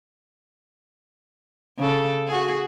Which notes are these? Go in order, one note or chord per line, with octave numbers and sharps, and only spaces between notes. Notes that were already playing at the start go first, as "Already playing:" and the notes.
C#3 A4
F#4 G#4